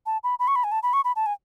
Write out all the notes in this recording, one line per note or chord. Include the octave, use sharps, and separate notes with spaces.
A5
B5
B5
C#6
B5
G#5
A5
B5
C#6
B5
A5
G#5